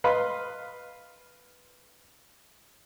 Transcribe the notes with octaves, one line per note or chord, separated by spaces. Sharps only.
B4 D#5 F5 B5 C6